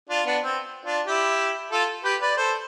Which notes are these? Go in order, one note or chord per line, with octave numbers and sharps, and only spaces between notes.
D4 F4
B3 D4
C4
D4 F4
E4 G4
F4 A4
G4 B4
B4 D5
A4 C5